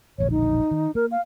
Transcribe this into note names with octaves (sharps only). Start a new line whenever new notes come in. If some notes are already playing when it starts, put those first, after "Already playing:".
E1 A#1 D3 C#5
D#4
D#3
A#3 A#4
F5